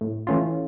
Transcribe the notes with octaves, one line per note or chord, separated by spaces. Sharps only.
A2
E3 A3 C#4 F4